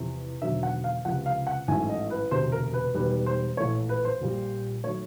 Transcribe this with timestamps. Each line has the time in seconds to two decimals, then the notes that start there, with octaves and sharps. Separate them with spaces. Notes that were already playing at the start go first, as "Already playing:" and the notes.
Already playing: E2 C3 F3
0.42 E1 D#2 D3 F#3 E5
0.63 F#5
0.84 F5
1.05 C#2 C3 F3 F#5
1.26 F5
1.47 F#5
1.68 A1 G#2 D#3 F#3 A3 G#5
1.89 D#5
2.10 B4
2.31 E1 D2 C3 C5
2.52 A#4
2.74 B4
2.94 E1 D#2 D#3 G3 B4
3.26 C5
3.57 A#1 A2 E3 A3 C#5
3.89 B4
4.05 C5
4.21 A#1 A#2 G3
4.84 D#3 F#3 A3 C#5